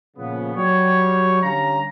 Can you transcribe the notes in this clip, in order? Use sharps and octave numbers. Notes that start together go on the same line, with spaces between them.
A#2 C#3 F3 B3
F#3 G3 F#4 C#5
D3 G3 C#4 F5 A#5